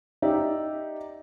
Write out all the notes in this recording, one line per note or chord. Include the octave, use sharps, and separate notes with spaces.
D#4 G4 D5 E5